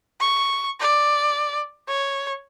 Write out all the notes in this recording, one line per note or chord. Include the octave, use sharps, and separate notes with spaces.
C#6
D5
C#5